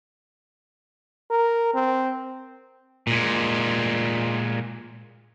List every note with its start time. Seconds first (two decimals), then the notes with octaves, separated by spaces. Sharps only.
1.30 A#4
1.74 C4
3.07 A#2 G#3